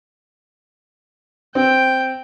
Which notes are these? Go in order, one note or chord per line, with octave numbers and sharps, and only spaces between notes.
C4 G5